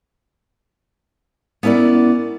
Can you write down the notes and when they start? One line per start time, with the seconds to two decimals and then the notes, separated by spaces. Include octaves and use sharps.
1.63 B3 C#4 E4 A#4 D5